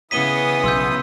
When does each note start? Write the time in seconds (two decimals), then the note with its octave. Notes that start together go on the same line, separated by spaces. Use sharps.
0.11 C#3 E3 B3 D#6 B6 D#7 G7
0.64 B1 C6 E6 G6